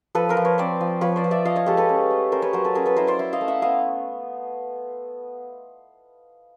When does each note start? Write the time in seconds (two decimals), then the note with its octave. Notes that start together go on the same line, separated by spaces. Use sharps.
0.15 F3 A4 B4
0.29 A#4 C5
0.37 F3
0.45 B4 C#5
0.58 C4 C5 D5
0.81 F3
1.01 F3 B4 C#5
1.16 C5 D5
1.24 F3
1.31 D5 E5
1.45 F3 D#5 F5
1.56 C#5 D#5
1.66 G#3 G4 A4
1.77 A4 B4
1.89 C#4
2.10 A3
2.32 C#4 A#4 C5
2.42 B4 C#5
2.53 F#3 A#4 C5
2.65 A4 B4
2.75 C#4 G#4 A#4
2.86 A4 B4
2.97 E4 A#4 C5
3.07 C5 D5
3.19 E4
3.33 D#5 F5
3.41 A3
3.48 E5 F#5
3.62 B3 D#5 F5